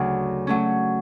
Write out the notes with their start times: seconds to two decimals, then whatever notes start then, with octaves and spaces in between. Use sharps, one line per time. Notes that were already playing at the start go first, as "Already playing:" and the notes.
Already playing: D2 C#3 F#3
0.47 F#3 A3 C#4